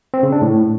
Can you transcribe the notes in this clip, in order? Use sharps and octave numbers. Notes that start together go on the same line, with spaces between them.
C4
C#3
D4
A2